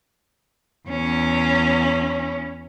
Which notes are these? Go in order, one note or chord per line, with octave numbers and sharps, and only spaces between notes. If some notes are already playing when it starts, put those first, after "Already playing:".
E2 C#4